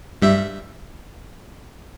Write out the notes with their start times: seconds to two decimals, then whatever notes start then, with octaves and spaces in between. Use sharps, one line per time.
0.22 G2 G3 E5